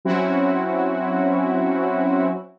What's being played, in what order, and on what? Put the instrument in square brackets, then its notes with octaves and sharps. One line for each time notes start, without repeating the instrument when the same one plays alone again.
[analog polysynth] F#3 C4 C#4 E4 F#4